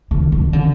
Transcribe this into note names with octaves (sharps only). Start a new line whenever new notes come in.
D#3
D#3
D3